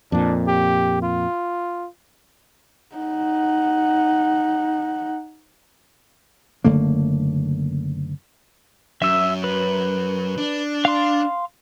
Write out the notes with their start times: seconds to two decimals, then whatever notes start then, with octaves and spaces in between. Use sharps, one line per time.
0.12 F2 A#2 D4
0.47 G4
1.02 F4
2.96 D#4 F#5
6.64 F#1 D3 A3 A#3
9.02 F#2 E5 E6
9.44 B4
10.38 D4
10.85 F5 C6